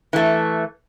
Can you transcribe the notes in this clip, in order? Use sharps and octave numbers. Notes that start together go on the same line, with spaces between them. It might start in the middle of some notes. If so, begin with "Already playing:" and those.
E3 A3